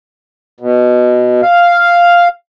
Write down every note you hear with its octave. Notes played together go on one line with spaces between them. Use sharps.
B2
F5